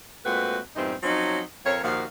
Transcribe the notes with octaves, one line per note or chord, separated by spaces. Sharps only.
A#2 G#3 A3 C4 F#4 B4
E2 G2 A#2 E3 C4 D#4
F3 F#3 C4 C#4 D#4
F2 C4 A#4 C#5
D#2 A#2 F3 F#4 F5